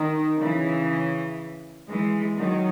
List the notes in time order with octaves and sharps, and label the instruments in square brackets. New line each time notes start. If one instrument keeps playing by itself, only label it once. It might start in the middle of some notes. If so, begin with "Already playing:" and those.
Already playing: [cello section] D#3
C#3 E3
E3 G#3
D#3 F#3